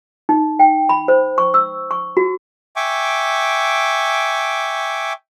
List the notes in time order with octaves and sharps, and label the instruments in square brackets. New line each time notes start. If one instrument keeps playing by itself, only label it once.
[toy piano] D#4
G5
B5
C5
C#6
E6
C#6
F#4
[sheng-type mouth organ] E5 G5 G#5 C#6 D6